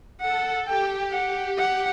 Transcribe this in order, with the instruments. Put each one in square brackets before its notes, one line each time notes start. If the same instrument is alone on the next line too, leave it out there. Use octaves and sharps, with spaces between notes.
[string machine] A4 [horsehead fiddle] F#5
[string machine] G4 [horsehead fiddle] G5
[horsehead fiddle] F#5
F#5